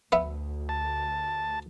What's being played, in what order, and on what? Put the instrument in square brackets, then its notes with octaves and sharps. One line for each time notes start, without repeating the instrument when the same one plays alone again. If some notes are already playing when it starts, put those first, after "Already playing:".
[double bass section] D2 [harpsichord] B3 E5
[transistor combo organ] A5